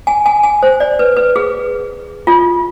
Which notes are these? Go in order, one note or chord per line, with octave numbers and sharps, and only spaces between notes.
G#5
G#5
G#5
C5
D5
B4
B4
G#4
F4